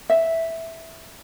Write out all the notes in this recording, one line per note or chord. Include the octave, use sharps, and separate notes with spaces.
E5